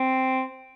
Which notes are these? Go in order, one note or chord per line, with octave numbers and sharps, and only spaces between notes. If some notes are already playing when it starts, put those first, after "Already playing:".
Already playing: C4